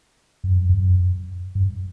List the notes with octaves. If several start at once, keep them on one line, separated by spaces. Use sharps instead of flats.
F#2
F2
F#2
G2